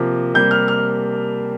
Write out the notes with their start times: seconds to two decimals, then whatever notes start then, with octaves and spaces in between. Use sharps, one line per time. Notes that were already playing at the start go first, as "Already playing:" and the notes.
Already playing: C3 F3 A#3
0.34 C3 G3 A#3 G6
0.51 F6
0.68 F6